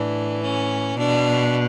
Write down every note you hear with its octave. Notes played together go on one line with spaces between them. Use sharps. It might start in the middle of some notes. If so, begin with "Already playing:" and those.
Already playing: A2 E3 D4
C#4
B2 D4